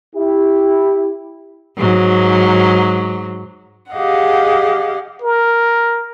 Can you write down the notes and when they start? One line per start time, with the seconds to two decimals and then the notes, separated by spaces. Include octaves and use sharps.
0.16 E4 G4
1.77 G#2 F#3
3.93 G4 G#4 D#5 F5 F#5
5.22 A#4